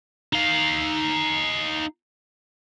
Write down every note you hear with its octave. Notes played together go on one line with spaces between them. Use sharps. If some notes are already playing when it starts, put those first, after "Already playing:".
D#4 F5